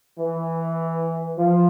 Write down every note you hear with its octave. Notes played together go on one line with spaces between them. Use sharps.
E3
F3